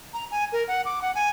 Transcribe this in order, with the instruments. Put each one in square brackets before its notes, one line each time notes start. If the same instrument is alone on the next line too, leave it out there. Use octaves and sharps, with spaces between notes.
[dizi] A#5
G#5
A#4
F#5
D6
F#5
G#5